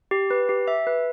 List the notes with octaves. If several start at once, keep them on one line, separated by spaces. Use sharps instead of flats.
G4
B4
G4
E5
B4